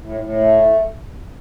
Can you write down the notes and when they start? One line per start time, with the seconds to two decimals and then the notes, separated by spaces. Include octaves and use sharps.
0.01 A2
0.20 A2
0.39 A3